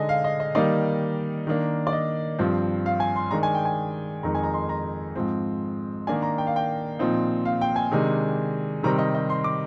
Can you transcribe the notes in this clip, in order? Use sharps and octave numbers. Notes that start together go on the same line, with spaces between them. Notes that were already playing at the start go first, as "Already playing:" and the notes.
Already playing: D3 G#3 D#4 D#5 G#5
F5
D#5
D#5
D#3 G3 A#3 D#4 D5
D#3 A#3 D4
D5
D#5
G2 F3 C4
F5
G#5
C6
D#3 G#3 D4 A#5
G#5
G5
G#5
F2 D#3 G#3 D#4 A#5
G#5
A#5
C6
A#5
G#2 F3 C4
D#3 A#3 D4 G#5
A#5
G5
F5
G5
A#2 F3 C4 D#4
F5
G5
G#5
C3 D#3 G#3 D4
C3 D#3 G3 C4 A#5
D#5
D#5
C6
D6